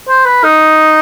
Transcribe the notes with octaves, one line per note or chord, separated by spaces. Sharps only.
C5
B4
D#4